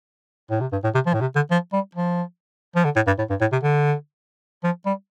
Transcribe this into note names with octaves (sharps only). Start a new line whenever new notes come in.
A2
C3
G2
A2
C3
F3
A2
C3
D3
F3
G3
F3
F3
D3
A2
G2
A2
G2
A2
C3
D3
F3
G3